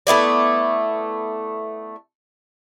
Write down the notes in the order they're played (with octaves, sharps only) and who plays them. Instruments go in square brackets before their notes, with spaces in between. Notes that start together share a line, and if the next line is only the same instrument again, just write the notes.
[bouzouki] A3 B3 E4 D5